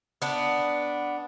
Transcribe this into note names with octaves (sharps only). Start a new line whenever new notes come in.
B3 D4